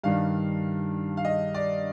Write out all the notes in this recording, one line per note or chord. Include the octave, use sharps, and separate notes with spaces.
G2 D#3 G3 D4 F5
F5
D#5
D5